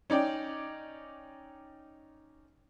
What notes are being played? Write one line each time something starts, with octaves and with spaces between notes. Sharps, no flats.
C#4 D#4 D5 G5